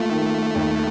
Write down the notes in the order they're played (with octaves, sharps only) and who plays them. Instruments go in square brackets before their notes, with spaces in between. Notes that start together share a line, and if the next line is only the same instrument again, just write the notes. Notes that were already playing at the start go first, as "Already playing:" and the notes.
Already playing: [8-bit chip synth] A3 [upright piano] A#3 F4
[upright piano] D#3
D#2